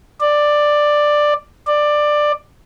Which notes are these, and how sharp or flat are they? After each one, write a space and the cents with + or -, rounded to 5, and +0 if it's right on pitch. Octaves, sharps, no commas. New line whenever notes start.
D5 +10
D5 +15